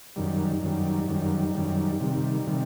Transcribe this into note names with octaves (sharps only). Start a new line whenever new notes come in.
F#2 D#3 G3
F#2 D#3 G3
F#2 D#3 G3
F#2 D#3 G3
C3 D#3 G3
C3 D#3 G3